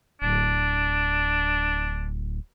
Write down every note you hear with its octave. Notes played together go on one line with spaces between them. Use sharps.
D1 D4